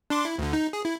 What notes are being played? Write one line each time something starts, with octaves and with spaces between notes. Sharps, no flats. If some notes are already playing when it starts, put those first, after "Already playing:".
D4 C6 D6
E4
D2 D3
D#4
G#4
E4